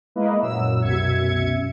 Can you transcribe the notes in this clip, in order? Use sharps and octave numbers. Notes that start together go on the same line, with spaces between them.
G#3 A#3 E4 B4 D#5
F#2 A#2 F#3 E6
C2 F#2 B2 E5 G#6 C#7